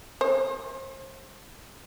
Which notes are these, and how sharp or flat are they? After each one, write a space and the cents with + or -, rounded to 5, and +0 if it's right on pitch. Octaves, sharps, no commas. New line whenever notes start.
C5 +40